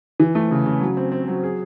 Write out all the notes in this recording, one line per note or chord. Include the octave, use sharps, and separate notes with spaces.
E3
A3
C#3
C#3
F#3
C4
C4
F#3
G#4